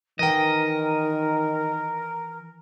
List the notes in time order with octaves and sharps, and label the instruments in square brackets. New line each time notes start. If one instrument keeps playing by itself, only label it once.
[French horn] D#3 [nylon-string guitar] E3 G5 [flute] A#4 [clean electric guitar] D#5